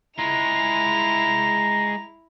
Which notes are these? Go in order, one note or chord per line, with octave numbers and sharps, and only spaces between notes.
G#3 E4 F4 A#5 F7